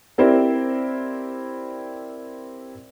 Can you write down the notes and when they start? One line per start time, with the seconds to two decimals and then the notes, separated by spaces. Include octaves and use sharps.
0.18 C4 E4 G4 A#4 C5 D5